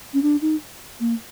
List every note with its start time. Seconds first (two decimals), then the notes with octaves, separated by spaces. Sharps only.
0.14 C#4
0.22 D4
0.41 D#4
1.00 A#3